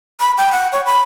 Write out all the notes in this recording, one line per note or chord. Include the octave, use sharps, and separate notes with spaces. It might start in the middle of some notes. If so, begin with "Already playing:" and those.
B5
G5
F#5
C#5
B5